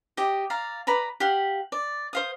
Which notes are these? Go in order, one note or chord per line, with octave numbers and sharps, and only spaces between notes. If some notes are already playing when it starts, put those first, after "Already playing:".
G4 D#5
D5 F5 A#5
B4 D5 A#5 B5
G4 F5 F#5
D5
C5 F5 D#6